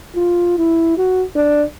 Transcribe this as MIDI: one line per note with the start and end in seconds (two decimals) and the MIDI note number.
0.16 0.54 65
0.58 0.94 64
0.98 1.24 66
1.36 1.63 62